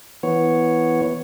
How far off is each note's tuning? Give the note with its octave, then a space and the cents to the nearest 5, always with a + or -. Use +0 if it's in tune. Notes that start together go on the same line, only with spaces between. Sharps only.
E3 +0 B3 +0 C#5 +0